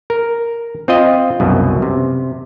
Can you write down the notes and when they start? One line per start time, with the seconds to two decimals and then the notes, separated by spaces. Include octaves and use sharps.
0.10 A#4
0.88 C4 F4 D#5
1.40 C2 F#2 B2
1.82 C3